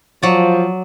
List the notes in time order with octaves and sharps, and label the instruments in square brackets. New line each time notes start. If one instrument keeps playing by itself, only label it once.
[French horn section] F3 [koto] F#3 D5